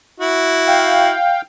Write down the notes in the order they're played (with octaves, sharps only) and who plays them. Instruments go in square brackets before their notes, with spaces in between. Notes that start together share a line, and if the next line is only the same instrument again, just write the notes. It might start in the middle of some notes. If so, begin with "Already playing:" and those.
[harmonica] E4 F#4
[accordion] F5 G5